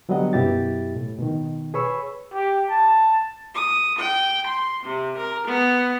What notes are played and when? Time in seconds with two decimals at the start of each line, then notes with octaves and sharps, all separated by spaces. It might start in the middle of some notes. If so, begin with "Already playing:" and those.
0.09 D3 F#3 G3 B3 D#5 F#5
0.33 F#2 B2 E4 G4 A6
0.96 A2
1.19 B2 D#3
1.74 G#4 B4 C#5 B5 C#6 E6
2.34 G4
2.70 A5
3.54 D#6
3.99 G5
4.48 C6
4.85 C3
5.18 A#4
5.47 B3